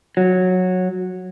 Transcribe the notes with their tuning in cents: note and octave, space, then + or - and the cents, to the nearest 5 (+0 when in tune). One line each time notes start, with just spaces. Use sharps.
F#3 -10